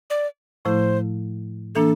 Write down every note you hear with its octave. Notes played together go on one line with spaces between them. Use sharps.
D5
A2 F3 A3 E4 C5
E3 A#3 D4 A4